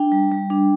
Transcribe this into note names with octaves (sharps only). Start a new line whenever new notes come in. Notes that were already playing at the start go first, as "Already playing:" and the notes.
Already playing: D4 G5
G3
G3
D4